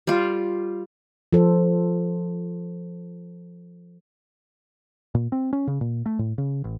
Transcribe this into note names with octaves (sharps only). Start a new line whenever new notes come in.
G3 F4
F3 A4 C5
A#2
C4
C#4
C#3
A#2
A3
A2
C#3
A1